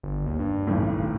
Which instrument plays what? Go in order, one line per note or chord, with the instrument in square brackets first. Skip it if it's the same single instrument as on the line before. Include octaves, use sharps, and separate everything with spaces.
[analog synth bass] G1
D#2
G2
[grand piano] G#1 C#2 A2
[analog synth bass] E1